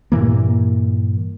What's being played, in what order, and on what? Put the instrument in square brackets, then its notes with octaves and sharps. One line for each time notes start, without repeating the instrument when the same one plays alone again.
[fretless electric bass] G2 A#2 E3 A#3